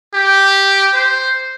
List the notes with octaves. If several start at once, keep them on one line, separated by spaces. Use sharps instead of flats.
G4
C5